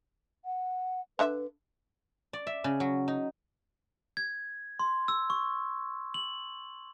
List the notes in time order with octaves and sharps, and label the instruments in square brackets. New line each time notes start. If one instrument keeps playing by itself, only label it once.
[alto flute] F#5
[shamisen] D3 D4 E5 [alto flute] B4
[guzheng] D5
E5
C#3
F#3
D#4
[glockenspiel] G#6
C6
E6
C#6
F#7